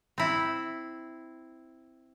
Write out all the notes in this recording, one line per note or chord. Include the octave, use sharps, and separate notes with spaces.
C4 E4